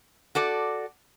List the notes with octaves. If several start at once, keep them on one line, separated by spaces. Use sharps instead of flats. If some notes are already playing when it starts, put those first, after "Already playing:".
F#4 A4 D5